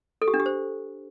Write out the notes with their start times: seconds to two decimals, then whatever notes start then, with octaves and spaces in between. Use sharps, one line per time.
0.22 A4
0.28 G4
0.34 D4
0.40 G4
0.46 C5